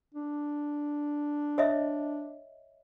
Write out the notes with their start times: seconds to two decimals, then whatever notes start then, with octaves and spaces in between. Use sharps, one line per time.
0.15 D4
1.58 C#5 D#5 E5